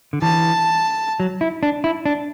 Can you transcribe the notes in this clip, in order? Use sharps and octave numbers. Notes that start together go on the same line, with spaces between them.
D3
E3 A5
F#3
E4
D4
E4
D4